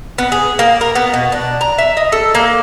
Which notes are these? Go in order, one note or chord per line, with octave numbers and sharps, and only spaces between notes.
B3
G#4
A#3
A#4
B3
B2
D4
A#5
E5
D#5
A4
A#3